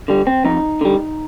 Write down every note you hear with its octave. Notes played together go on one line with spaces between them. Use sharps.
D3 G3
C4
F2 D#4
D3 G3